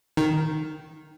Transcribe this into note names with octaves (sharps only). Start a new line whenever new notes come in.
D#3